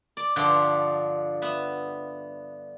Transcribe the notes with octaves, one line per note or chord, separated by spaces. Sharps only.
D5
G2 D3 F3 D4 G4 C6
B3 E5